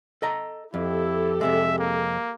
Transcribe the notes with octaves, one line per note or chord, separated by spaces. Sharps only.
A4 D#5 A#5
F2 E4 G4 A4
F2 C3 G#3 E5
A#3